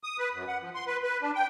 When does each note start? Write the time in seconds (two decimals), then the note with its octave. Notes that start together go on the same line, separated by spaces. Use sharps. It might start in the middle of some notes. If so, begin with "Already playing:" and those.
0.04 D#6
0.19 B4
0.34 F#2
0.48 F#5
0.61 F3
0.75 C6
0.86 B4
1.03 B4
1.22 D4
1.35 G5